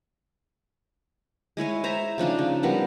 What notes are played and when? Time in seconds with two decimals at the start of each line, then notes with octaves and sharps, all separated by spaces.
1.57 G#3 E4 C#5 G#5
1.84 C5 E5 A#5
2.18 C#3 F3 D4 D#4
2.39 C#3
2.63 F3 G3 B3 A#4